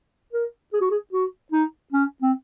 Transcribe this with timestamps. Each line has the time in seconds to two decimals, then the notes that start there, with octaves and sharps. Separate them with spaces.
0.33 A#4
0.73 G#4
0.81 F#4
0.91 G#4
1.13 F#4
1.52 D#4
1.92 C#4
2.22 C4